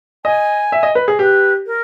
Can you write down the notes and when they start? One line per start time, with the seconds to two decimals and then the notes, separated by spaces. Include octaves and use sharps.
0.25 D#5 G#5
0.72 E5
0.83 D#5
0.95 B4
1.08 G#4
1.19 G4 B4
1.66 A#4